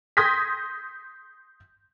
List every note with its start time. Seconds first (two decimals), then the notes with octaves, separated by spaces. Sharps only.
0.17 C6 D#6 G6 G#6 A#6 B6